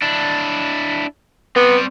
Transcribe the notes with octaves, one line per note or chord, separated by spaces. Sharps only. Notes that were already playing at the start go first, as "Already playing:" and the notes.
D4 E4
B3 C4 D5